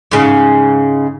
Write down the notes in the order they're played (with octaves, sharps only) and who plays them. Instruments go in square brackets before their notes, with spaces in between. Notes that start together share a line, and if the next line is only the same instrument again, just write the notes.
[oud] G#2 C#3